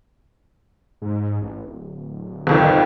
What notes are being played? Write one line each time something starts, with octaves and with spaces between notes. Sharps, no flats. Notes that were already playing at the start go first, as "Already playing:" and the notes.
G#2
A1
D1
G1 C2 F2 D#3